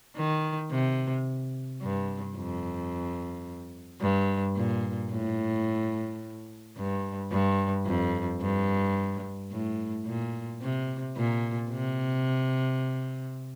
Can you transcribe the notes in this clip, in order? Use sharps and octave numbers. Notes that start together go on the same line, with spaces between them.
D#3
C3
G2
F2
G2
A#2
A2
G2
G2
F2
G2
A2
A#2
C3
A#2
C3